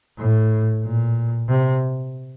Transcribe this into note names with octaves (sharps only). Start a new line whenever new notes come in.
A2
A#2
C3